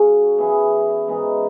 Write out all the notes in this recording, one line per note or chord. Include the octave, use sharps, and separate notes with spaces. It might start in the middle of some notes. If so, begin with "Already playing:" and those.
Already playing: C#3 F#3 C#4 F#4
E3 B3 E4 G#4
G#2 E3 B3 D#4